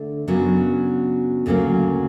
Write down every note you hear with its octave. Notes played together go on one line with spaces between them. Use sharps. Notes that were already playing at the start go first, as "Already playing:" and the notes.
Already playing: D3 A3
F#2 C#3 F#3 B3 D4
D2 C#3 F#3 A#3 C#4